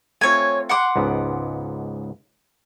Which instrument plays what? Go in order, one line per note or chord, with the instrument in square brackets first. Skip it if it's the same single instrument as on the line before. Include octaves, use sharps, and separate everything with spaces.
[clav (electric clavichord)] A3 C4 F4 [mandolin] C#5 G#5
[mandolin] F#5 C6 D6
[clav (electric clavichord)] C#2 G#2 B3